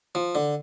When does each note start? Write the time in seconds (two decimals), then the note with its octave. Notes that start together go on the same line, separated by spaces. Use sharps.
0.15 F3
0.35 D3